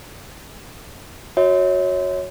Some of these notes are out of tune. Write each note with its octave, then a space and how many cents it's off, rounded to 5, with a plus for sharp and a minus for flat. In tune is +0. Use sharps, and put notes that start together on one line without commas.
F#4 -10 C#5 +0 E5 -40